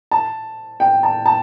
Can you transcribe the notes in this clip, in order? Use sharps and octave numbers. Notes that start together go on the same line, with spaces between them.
A5
G5
A5
A5